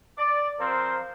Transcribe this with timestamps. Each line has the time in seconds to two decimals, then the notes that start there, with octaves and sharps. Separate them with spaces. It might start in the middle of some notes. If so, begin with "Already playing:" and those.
0.18 D5
0.59 F3 C4 A#4 C5